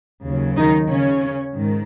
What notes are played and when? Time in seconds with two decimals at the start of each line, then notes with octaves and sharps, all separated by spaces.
0.25 D#2 C#3 F#3
0.57 D#3 D#4
0.90 C#3 C#4
1.54 G#2 D#3